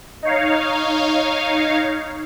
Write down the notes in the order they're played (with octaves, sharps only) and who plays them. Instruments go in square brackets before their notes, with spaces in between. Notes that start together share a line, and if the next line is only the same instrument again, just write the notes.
[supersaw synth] D#4 C#5 F5